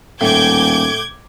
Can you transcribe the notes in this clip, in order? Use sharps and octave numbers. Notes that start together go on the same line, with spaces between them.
D#1 A2 D6 G6 G#6